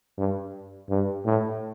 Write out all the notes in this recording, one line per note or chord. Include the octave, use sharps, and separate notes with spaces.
G2
G2
A2